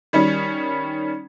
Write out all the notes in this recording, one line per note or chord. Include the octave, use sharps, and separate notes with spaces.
D#3 G3 C#4